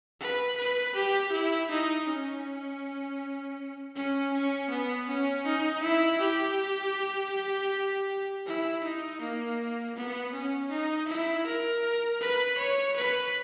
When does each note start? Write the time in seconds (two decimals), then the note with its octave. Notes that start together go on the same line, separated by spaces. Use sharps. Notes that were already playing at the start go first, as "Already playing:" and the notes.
0.20 B4
0.57 B4
0.95 G4
1.32 E4
1.71 D#4
2.07 C#4
3.96 C#4
4.33 C#4
4.70 B3
5.08 C#4
5.46 D#4
5.83 E4
6.20 G4
8.46 E4
8.83 D#4
9.21 A#3
9.96 B3
10.32 C#4
10.70 D#4
11.08 E4
11.46 A#4
12.21 B4
12.58 C#5
12.96 B4